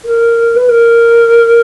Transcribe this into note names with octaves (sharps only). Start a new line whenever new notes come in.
A#4
B4
A#4